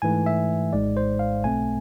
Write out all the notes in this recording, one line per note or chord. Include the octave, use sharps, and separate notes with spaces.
G#2 E3 A3 G#5
E5
G#1 G#2 G#3 D5
C5
F5
B1 B2 A3 C4 G#5